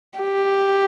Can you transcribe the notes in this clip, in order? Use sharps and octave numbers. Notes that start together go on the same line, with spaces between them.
G4